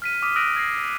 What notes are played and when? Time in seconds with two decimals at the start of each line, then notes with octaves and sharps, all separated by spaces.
0.02 F6 B6 D#7
0.22 D6 D#6 F6 B6 D#7
0.36 D#6 E6 F#6 A#6 D7 D#7
0.56 G#6 A#6 C7